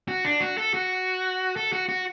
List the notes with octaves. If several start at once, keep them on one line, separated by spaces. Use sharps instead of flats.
F#4
D4
F#4
A4
F#4
A4
F#4
F#4